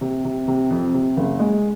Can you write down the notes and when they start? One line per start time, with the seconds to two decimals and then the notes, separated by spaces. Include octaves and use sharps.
0.01 C3
0.25 C3
0.48 C3
0.70 F2
0.94 C3
1.17 F#1
1.40 G#3